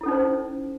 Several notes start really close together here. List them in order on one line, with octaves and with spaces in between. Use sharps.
E4 A4 C#4 D#4 C5